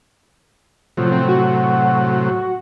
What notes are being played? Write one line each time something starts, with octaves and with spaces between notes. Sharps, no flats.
A2 C3 F3 F#3
C4
F#4